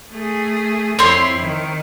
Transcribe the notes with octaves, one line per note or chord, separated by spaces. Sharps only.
A3 G#4
F2 C4 E4 C#5 C6
D#3